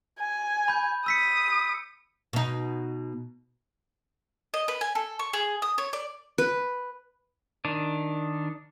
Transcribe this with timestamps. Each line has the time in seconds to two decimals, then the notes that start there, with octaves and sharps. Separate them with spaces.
0.20 G#5
0.68 B5 G6
1.06 D#6 E6 B6 C#7
2.33 B2 D#4
4.54 D#5
4.68 B4
4.81 G#5
4.95 A4
5.19 C#6
5.33 G#4
5.62 D#6
5.78 C#5
5.93 D5
6.38 B4
7.65 D#3 D4